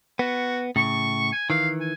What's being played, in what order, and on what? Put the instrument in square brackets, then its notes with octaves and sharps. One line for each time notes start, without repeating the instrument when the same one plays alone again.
[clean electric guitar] B3 [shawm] F#4
[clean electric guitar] A2 C#3 [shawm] C#6
[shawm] G#5
[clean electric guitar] D#3 E3 [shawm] F5
[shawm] G#5